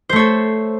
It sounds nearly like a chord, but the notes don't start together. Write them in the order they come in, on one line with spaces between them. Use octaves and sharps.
C5 A3 C#5 A4